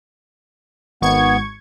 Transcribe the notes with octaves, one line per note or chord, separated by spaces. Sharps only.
G#1 B3 C#6 G#6